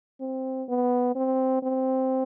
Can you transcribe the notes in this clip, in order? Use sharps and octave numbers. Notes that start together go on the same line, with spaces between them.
C4
B3
C4
C4